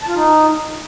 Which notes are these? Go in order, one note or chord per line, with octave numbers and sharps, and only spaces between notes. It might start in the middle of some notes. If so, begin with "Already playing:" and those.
A5
F4
D#4